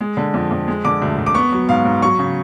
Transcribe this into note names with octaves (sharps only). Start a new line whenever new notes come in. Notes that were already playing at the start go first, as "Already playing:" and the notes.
G#3
D3
F2
F2
G#3
D3 D6
D2
D2
D6
B3 C#6
F#3
G#2 F5
G#2
F#3 C#6
C#3